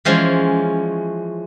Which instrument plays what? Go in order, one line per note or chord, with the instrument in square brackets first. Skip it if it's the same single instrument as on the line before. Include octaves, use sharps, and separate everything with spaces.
[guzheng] E3 F3 G#3 C#4